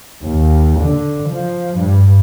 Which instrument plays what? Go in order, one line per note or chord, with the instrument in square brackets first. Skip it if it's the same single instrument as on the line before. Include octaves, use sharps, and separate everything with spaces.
[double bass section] D#2
D3
F3
G2